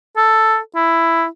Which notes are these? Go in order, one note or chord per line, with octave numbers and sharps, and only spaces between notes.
A4
E4